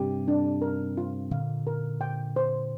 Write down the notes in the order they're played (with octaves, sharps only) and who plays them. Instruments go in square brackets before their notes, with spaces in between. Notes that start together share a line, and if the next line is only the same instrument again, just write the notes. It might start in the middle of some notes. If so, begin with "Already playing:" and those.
Already playing: [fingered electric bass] G2 C3 [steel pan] G4
[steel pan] D4
A#4
F4
[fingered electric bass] A#2 D3 [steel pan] F5
[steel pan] A#4
G5
C5